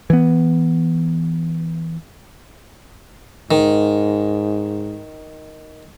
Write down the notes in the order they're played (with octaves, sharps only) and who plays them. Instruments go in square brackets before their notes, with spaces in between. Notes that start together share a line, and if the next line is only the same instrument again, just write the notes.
[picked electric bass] E3 B3
[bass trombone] G#2 [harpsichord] D#3